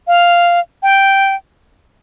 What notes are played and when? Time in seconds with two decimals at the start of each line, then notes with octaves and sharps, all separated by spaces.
0.07 F5
0.83 G5